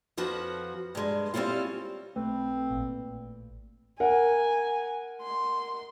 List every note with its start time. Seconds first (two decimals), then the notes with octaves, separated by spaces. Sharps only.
0.17 F2 F3 F#4 B4
0.95 G2 G#3
1.34 G3 C4 C#4 E4 F4
2.16 B1 A3 C4 B4
2.70 A1 A#2
4.00 A#4 F#5 G#5
5.22 C6